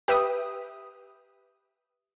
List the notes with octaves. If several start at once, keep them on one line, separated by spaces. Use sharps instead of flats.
G4 B4 E5 D#6